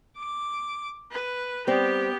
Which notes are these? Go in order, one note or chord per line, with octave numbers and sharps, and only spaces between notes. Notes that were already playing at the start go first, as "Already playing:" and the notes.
D6
B4
G3 B3 C4 G4